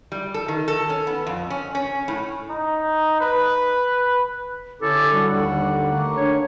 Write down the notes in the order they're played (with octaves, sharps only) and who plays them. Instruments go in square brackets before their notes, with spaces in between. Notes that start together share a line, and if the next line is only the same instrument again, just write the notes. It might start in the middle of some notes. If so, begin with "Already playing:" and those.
[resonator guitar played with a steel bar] G3
A4
D#3
A4
C#4
B3
F2
C#4
C#4
A2
[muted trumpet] D#4
B4
[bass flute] D3 [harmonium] C#4 E4 G4 [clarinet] A4
[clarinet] G3 [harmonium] D4 F#4
[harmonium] D#2 G3 [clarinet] F#5
[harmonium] A3 A#3
[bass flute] D4 [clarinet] C#5